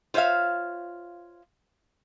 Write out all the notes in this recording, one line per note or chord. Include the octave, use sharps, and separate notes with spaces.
F4 C5 C#5 E5 F5